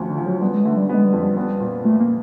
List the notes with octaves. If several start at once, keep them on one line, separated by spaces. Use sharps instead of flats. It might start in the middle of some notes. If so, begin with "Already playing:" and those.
Already playing: D2 F3 A3
D3
F3
F#3
G3 B3
G#3
D3 A3
G3
G#3 B3
G3
F2
G3
B3
A#2
A#2 A3
A#3